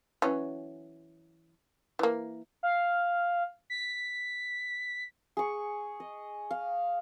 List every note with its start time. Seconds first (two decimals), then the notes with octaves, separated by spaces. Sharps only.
0.22 E3 F#3 C#4
1.99 E3 A#3
2.63 F5
3.70 B6
5.37 G#4 C#6
6.00 D#5
6.51 F5